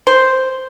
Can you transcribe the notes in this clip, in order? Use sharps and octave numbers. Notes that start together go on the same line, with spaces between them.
C5